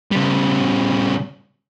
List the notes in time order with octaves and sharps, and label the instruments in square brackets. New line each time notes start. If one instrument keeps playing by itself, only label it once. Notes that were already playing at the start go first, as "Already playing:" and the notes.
[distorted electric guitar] C#3 G3